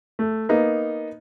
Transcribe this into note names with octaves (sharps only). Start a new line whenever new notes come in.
A3
A#3 B3 D#4